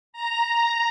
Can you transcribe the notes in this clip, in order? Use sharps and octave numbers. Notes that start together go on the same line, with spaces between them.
A#5